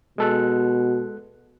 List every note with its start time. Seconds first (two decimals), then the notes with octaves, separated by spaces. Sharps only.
0.18 B2 G#3 A4 F#6